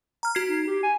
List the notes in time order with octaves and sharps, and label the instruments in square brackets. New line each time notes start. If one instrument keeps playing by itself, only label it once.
[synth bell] A#5 F6
F#4 G#6 C7
[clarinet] D#4
G4
G#5